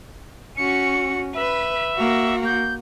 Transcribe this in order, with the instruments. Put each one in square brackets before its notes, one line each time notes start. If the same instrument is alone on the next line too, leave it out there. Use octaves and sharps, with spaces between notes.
[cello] C#4 F#4 [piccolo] C#7
[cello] B4 [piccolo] E5
[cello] A#3 F#4
[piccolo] G6